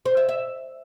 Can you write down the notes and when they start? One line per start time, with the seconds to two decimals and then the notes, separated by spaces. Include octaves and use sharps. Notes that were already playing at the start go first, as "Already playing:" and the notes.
0.06 C5
0.17 E5
0.29 E5